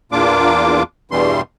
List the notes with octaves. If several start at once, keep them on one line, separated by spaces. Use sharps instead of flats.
E2 A#2 A#3 D4 F4 D6
E2 G2 B2 E3 G3 C6